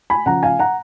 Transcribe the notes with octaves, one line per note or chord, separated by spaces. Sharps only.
G#5 B5
C#3 F3 F#5 A#5
F5 G#5
F#5 A#5